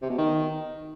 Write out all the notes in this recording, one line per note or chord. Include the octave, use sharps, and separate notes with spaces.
C3
B2
D#3